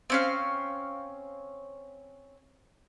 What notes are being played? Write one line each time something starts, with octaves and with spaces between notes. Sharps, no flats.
C4 C#4 F5